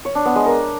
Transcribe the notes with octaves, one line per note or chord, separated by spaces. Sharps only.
C#5
D4
B3
G#3
A#4